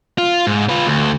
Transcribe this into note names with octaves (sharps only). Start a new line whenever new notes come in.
F4
G#2
F4 B4
D2